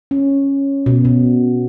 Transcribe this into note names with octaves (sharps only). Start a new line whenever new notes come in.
C#4
B2
B2